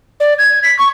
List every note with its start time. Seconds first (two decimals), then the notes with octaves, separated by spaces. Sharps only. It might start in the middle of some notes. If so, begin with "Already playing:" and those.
0.20 D5
0.38 G#6
0.63 B6
0.78 C#6